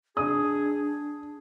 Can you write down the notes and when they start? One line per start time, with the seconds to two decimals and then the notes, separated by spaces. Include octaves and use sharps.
0.17 D4 G#4 D#6